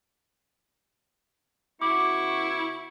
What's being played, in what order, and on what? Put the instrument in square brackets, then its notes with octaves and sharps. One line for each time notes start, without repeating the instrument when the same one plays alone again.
[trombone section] C#3 B3 F#4 [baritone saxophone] E4 [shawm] C#6 [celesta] D6